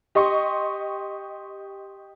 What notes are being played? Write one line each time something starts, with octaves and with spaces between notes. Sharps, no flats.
G4 D#5 C6 C#6